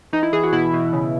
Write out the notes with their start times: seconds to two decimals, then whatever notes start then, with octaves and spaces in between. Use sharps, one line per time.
0.13 E3 D#4
0.23 E4
0.33 E3 G#4
0.43 F#4
0.52 B2 E4
0.73 B2
0.93 C#3